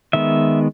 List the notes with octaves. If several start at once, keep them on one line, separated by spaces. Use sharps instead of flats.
D#3 G#3 B3 E5